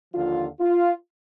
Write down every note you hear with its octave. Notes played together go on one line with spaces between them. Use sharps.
D#2 D3 F3 F4
F4